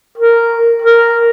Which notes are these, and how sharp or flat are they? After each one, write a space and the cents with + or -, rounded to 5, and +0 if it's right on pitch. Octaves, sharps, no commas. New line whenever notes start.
A#4 -5
A#4 -5